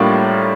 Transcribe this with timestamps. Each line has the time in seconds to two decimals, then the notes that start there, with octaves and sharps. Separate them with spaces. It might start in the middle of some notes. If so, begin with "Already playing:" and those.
Already playing: A2 G3 A#3 D4 F4